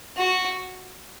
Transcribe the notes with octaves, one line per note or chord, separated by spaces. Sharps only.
F#4